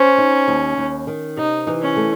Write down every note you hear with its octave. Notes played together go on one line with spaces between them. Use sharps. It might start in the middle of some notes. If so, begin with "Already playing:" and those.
Already playing: C#4 C5
D#4
D#2
D#2
D#3
C3 D#4
E3
C#4
A3